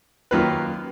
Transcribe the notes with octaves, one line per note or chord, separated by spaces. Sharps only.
F#2 D#3 A#3 F4 B4